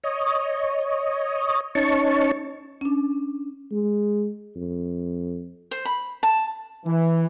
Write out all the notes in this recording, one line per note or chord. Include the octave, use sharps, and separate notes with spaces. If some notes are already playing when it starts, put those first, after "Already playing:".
C#5 D#5
C#4 D#4 C#5 A5 C#6
C#4 D4
G#3
F2
C5
B5
A5
E3